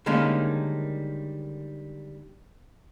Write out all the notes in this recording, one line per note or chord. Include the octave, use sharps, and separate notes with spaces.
D3 D#3 G3 G#3 A#3 C#4